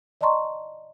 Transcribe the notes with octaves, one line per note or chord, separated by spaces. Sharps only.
D5 D#5 A5 A#5 C6 C#6